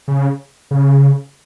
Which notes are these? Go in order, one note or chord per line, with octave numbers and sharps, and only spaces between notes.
C#3
C#3